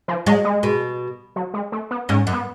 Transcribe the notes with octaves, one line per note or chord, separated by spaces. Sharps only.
F3
F#3 G#3
G#3
B2
F#3
G#3
A3
B3
G#2 C#4
F#2
B3